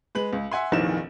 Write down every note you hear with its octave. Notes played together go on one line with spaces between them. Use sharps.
G#3 B4 F#7
C#2
E5 F#5 G#5 C6
F1 A#1 A#2 D#3 E3 E7